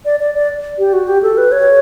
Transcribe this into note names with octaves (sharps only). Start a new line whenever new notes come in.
D5
D5
D5
G4
F#4
G4
A4
B4
C#5